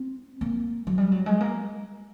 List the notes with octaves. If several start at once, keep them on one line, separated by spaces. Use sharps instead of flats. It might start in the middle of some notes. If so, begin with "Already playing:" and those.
Already playing: C4
A#3
F#3
G3
F#3
G#3
A#3